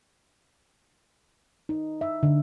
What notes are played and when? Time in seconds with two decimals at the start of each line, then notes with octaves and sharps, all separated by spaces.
1.69 D#4
2.01 E5
2.23 D3